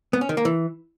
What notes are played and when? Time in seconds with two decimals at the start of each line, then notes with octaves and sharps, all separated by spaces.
0.13 B3
0.21 C#4
0.29 D#3
0.37 A#3
0.45 E3